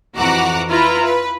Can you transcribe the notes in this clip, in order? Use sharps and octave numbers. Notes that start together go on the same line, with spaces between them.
F2 E3 F#4 F#5 A#5 D6
E4 F4 B4 A#5
B4